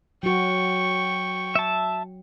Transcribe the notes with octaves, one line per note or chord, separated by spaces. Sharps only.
F#3 F#4 G5 C#6
E5 A5